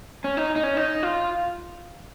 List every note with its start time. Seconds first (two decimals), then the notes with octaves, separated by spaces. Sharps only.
0.24 C#4
0.37 D#4
0.56 D#4
0.63 C#4
0.77 D#4
1.03 F4